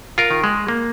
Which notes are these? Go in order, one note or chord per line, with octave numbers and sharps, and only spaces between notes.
F4 A#4
D#3
G#3
A#3